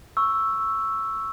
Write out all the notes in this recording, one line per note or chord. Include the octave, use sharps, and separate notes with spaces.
C#6 E6